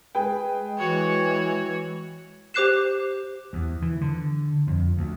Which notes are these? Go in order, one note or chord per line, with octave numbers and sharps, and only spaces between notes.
G#3 G#4 B4 G5
E3 F#4 C#5
G4 C5 D6 F#6 C7 E7
E2
E3
D3
F2
D2